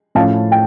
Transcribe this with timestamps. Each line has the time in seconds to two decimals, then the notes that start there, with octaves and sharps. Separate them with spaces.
0.15 A2 F3 C#4 F5 A5
0.52 G5